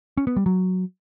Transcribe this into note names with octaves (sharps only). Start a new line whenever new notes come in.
C#4
B3
G3
F#3